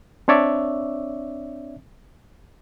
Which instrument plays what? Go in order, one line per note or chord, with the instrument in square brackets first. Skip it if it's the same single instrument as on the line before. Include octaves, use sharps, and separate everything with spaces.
[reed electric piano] C4 D4 C#5 D5 E5